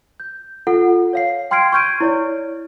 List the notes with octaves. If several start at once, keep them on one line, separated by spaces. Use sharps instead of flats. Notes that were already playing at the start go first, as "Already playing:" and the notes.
G6
F4 A4 F#5
C#5 F5 C7
G5 C6 F6 G#6 C7 D7
C#6 F6 G6 G#6 D7 D#7
E4 C#5 D5